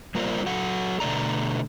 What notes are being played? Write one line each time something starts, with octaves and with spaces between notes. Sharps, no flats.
G3 A#3 F4 A#4 C5 D5
F#3 A4 F#5
B2 D3 A3 D5 A#5